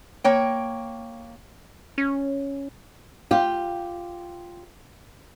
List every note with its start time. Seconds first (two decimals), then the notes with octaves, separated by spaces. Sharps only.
0.24 A#3 C#5 G5
1.98 C#4
3.31 F4 G4